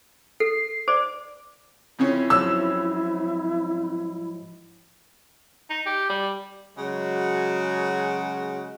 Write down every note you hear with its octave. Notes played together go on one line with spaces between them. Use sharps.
A4 C7
C5 D5 D6
F2 C#3 C#4 E4
G#2 F3 F#3 E6
D#4
G4
G3
C#3 F#3 G#3 F#4